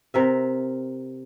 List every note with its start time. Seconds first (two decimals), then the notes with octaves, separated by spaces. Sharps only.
0.14 C3 A#4 E5